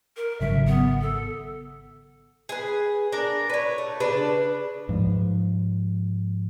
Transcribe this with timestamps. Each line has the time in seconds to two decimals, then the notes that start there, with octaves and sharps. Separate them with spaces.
0.17 A#4
0.41 G#1 C#3 F#3 E5
0.67 B3
1.01 A4
2.49 G#4 B4
3.12 D4 A#4 D5
3.50 B4 C#5
3.78 A3
4.00 C#3 D4 B4
4.89 G#2 F3